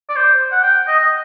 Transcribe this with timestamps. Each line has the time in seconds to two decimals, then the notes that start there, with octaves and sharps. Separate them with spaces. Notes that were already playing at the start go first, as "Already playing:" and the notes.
0.09 D5
0.16 C5
0.52 F#5
0.63 G5
0.87 D#5
0.99 D#5